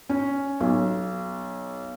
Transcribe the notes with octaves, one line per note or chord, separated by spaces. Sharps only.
C#4
B1